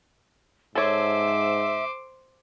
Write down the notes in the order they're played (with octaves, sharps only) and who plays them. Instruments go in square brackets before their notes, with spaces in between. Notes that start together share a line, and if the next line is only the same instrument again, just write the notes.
[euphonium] G#2 [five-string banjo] A4 C#5 [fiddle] C5 D6 [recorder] E5